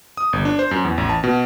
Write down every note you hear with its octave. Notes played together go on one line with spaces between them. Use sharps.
D#6
G1
D4
C5
F#2
E2
A1
A5
B2